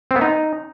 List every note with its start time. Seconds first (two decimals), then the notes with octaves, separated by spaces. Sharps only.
0.11 C4
0.16 B3
0.21 D#4